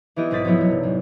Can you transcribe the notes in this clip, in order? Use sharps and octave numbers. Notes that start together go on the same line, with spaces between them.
E3 B3 E4 G4 D#5
B1 G#2 C4 D#6 A6 B6
F3 F#3 B3 C#4 D#4 E4
G2 F#3
C3
A1